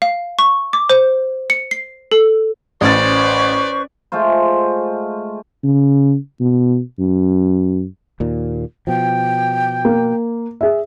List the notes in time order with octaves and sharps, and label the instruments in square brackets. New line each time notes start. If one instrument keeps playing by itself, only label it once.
[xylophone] F5
C#6
D6
C5
C#7
C7
A4
[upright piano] A1 A6 [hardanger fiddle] C#4 D5 [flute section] B4 C5 C#6
[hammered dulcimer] G#3 A3 F4 C5
[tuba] C#3
B2
F#2
[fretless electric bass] D#2 A#2
[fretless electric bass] B2 F3 [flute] G5
[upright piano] A#3
G#4 E5